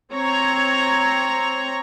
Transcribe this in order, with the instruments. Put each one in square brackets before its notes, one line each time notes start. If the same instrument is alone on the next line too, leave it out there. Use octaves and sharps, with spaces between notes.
[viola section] C4 C#5 A#5